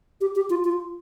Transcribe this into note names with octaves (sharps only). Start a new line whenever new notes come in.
G4
G4
F4
F4